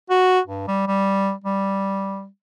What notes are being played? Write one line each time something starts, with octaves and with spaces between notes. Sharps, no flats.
F#4
G2
G3
G3
G3